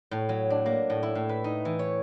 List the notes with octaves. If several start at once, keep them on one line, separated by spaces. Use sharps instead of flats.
A2
F#3
D4
A#3
A2
E4
A2
B4
D#4
E3
C#5